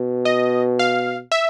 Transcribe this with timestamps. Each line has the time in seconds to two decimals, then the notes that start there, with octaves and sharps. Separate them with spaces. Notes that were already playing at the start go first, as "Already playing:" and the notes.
Already playing: B2
0.25 D#5
0.79 F5
1.32 E5